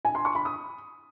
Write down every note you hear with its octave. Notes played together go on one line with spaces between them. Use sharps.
G#5
C6
C#6
B5
D#6